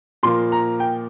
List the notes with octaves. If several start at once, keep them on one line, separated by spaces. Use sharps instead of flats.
A#2 F3 A#3 C6
A#5
G5